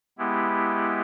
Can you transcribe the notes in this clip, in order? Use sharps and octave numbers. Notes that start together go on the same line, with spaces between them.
G#3 B3 E4 G4